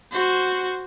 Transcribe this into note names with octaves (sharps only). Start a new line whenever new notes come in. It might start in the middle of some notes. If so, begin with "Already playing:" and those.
F#4 C5